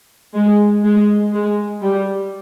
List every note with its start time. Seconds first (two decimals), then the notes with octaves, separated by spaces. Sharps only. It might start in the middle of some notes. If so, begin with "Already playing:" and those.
0.35 G#3
0.84 G#3
1.33 G#3
1.82 G3